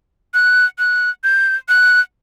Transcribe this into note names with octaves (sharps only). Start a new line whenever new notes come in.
F#6
F#6
G6
F#6